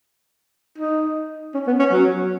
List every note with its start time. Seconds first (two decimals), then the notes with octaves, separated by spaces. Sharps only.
0.78 D#4
1.54 C#4
1.67 B3
1.79 C#4
1.92 F#3